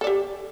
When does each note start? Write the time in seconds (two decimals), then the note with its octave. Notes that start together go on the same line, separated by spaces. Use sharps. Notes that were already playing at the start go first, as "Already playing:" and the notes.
0.01 A4
0.04 D5
0.07 G4